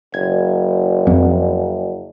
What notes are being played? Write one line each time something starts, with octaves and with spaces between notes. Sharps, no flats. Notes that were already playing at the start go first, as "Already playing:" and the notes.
F#1 G#6
F2